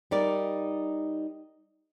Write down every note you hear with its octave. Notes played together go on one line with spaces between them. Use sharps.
G3 D#4 A#4 D5